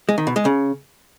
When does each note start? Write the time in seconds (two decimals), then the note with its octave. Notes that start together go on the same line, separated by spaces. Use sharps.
0.09 G#3
0.18 D#3
0.27 B2
0.36 G#3
0.45 C#3